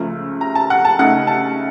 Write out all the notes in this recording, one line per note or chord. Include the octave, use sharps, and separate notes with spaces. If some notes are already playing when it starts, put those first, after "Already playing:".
Already playing: C#2 C#3 F3 A3
A#5
A5
F#5
A5
C#3 A3 D#4 F#5
A5